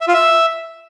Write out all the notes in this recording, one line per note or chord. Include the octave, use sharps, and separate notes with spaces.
E5
F4
E5